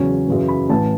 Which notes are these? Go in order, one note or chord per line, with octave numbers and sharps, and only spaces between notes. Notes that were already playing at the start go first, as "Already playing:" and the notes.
Already playing: E2 C#3 F#3 C#4
F#2 C#3 E3
B5
A1 A2 E3 A5